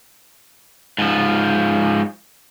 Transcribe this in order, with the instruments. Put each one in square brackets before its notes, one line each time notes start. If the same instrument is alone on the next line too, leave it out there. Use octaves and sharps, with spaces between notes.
[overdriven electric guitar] G#2 F3